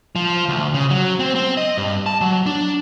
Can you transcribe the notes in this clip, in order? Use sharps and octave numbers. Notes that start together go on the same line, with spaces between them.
F3
D2
C#3
F#3
C4
C4
D#5
G2
A5
F#3
D4